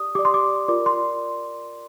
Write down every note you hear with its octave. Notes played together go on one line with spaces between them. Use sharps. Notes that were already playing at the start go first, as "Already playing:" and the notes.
Already playing: G4 D5 D#6
G4 D5 D6
C6
D6
F4 A#4 D5 D6
C6